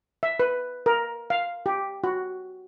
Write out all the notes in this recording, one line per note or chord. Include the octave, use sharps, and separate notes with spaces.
E5
B4
A#4
F5
G4
F#4